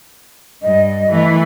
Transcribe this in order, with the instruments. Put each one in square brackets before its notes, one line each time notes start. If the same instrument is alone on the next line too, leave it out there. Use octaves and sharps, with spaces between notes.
[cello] G2 [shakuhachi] D#5
[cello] E3 A3